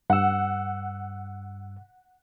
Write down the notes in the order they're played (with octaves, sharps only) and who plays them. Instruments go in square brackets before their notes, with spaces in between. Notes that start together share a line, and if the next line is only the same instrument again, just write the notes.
[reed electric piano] G2 E6 [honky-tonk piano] F#5